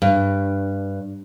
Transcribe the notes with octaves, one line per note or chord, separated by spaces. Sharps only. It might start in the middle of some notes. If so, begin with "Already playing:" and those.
G2